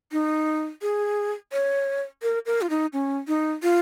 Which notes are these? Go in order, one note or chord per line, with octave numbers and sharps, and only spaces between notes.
D#4
G#4
C#5
A#4
A#4
F4
D#4
C#4
D#4
F4